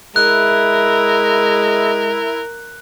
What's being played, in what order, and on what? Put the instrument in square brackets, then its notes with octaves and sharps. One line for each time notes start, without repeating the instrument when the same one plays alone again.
[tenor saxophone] G#3 [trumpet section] E4 [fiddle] A#4 [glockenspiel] F#6